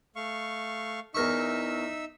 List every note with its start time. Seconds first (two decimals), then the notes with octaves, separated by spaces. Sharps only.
0.16 A3 F5 C#6
1.15 E2 D#4 A#4 E5 C#6 E6